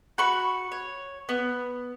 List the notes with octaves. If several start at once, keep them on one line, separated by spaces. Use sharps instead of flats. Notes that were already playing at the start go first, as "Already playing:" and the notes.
F#4 B5 C#6
C#5
B3